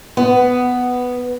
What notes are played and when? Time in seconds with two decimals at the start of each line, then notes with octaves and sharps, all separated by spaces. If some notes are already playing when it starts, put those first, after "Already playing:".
0.17 B3